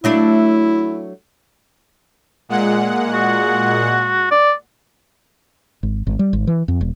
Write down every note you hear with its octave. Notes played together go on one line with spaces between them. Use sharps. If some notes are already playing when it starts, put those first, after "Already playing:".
F#3 A3 D4 E4
A#2 G#3 F#5
F#4
D5
G#1
G#1
G3
G#1
E3
F2
E1